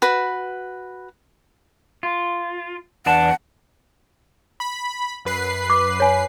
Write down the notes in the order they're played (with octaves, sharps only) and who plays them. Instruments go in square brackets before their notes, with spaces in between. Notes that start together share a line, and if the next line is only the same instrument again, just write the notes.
[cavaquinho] F#4 B4
[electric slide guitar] F4
[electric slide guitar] E2 D4 A5 [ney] F#5
[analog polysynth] B5
F#2 B4 C7
[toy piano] D6
C#5 G#5